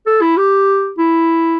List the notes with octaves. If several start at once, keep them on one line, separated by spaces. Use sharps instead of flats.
A4
E4
G4
E4